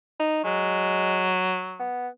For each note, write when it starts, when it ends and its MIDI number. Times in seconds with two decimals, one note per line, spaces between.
0.20 0.41 63
0.44 1.87 54
0.44 1.33 56
1.79 2.08 59